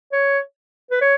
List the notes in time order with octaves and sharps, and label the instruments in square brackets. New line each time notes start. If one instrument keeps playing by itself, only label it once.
[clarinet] C#5
B4
C#5